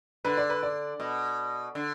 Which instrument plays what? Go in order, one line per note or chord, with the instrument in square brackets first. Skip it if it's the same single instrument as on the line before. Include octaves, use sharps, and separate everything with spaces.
[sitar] D3 [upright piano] B4
[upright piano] D5
B4
D5
[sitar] B2
D3